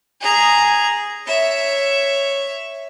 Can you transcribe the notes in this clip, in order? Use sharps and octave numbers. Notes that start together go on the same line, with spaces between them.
G#4 A#5
C#5 E5